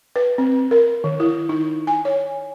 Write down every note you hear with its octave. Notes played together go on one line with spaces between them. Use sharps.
B4
C4
A#4
D#3
E4
D#4
G#5
C#5